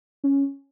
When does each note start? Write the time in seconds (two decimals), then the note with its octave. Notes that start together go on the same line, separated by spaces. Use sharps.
0.24 C#4